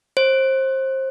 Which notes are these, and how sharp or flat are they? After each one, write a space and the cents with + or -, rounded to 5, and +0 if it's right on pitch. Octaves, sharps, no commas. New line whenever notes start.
C5 +25